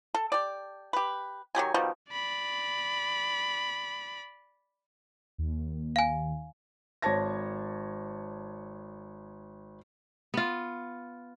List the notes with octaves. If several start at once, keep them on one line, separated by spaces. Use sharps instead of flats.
A4
G4 D5
G4 B4
D#3 F#3 G4 G#5
B2 D#3 F3 G3
D5 B5
D#2
F5 G#5
G#1 C5 C#5 A5 G#6 A#6
B3 F4